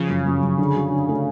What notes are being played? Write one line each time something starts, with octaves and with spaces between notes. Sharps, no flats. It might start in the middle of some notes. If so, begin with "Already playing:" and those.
Already playing: C#3 F3
F#2
F#2
F#2
D3
F#3
D3
A3